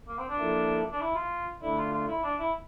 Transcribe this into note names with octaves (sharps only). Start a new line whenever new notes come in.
A#3
C4
D4
F3 A#3 E4 A4
D4
E4
F4
D3 A3 D4 E4
F4
F4
E4
D4
E4